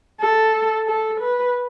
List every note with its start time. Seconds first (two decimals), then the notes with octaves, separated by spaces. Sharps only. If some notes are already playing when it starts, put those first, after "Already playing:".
0.20 A4
0.87 A4
1.21 B4